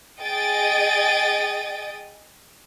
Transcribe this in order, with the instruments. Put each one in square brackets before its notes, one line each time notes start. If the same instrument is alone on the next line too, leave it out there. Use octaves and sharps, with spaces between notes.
[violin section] G#4 D#5 G5 D#6 A6 D7